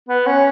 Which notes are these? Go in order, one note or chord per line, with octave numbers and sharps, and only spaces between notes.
B3
C#4